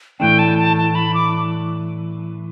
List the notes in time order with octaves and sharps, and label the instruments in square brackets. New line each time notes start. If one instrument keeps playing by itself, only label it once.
[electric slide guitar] A2 E3 A3 D4 [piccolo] G5
[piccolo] A5
A5
A5
B5
D6